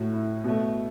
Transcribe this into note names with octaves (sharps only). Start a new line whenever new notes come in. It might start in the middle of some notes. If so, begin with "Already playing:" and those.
Already playing: A2 A3 F#4
E4
B2 A3